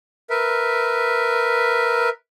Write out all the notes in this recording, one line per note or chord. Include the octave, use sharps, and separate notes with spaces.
A#4 B4 E5